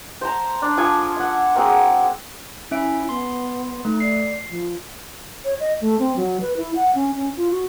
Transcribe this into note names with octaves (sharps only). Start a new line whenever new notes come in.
C5 A5 A#5
D4
F3 F4 A4 G#5
E5 F#5
A#3 C4 F#4 G#4
C#4 E4 E5 D7
B3 C6
A3 D#4
D5 C7
F3
C#5
D#5
A3
C4
F#3
B4
E4
F#5
C#4
C#4
F4
F#4